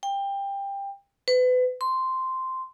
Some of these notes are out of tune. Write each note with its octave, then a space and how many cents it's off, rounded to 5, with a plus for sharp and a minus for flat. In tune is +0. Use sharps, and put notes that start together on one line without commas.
G5 +20
B4 +30
C6 -5